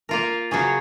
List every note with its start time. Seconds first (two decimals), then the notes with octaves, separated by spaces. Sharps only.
0.09 A#3 F4 A#4
0.51 C#3 F#3 C#4 G#4